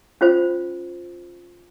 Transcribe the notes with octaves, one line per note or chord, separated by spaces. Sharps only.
C#4 F4 C5